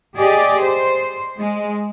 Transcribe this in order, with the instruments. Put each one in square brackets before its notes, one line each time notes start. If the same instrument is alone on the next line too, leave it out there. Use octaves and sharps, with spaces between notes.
[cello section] G4 G#4 D5 D#5
C5
G#3